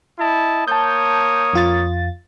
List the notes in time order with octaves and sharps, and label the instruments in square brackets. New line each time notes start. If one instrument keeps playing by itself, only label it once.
[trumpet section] E4 D#5 A5
[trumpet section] A#3 C#5 D#6 [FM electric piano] A5 G6
[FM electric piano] F2 F4 A6